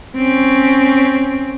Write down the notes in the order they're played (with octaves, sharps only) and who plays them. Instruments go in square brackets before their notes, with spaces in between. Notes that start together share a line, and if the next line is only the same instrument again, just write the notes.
[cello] C4 C#4